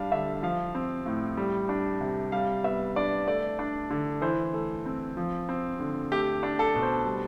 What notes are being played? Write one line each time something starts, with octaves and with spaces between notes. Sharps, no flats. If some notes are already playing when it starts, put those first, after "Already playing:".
Already playing: G3 D4 F5
D3 E5
F3 F5
C4
A2
G3
D4
C3
G3 F5
B3 E5
D4 D5
A3 D5
D4
D3
E3 C5
A3
C4
F3
C4
D3
A3 G4
D4
A4
B2
C5
G3